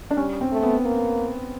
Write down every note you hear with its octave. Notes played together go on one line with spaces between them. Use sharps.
D4
G3 C#4
C4
A3
B3
A#3